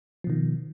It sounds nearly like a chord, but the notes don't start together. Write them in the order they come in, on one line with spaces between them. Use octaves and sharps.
F3 B2 D#3